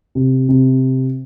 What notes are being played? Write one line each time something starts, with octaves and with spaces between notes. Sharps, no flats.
C3
C3